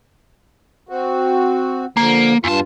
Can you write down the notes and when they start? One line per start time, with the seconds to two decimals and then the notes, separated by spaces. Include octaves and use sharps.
0.89 C4 F#4
1.97 D3 F3 A#3
2.44 E2 G2 F4 A5